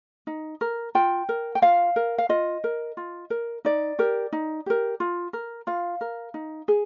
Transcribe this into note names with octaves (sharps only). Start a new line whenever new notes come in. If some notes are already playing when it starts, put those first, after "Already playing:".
D#4
A#4
F4 G5
A#4
G5
F4 F5
A#4
F5
F4 D#5
A#4
F4
A#4
D#4 D5
G4 A#4
D#4
G4 A#4
F4
A#4
F4 F5
A#4
D#4
G#4